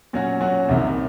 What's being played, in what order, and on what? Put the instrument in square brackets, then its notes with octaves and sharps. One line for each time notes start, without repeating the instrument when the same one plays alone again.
[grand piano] A#2 F#3 C#4 F#4
A#2 F#3 C#4 F#4
C2 C3 D#3